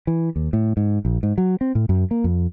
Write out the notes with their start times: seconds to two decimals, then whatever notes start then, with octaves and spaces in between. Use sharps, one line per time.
0.07 E3
0.36 D#2
0.53 A2
0.77 G#2
1.05 A#1
1.23 G#2
1.38 F#3
1.61 C4
1.75 A2
1.89 F#2
2.11 A#3
2.24 F2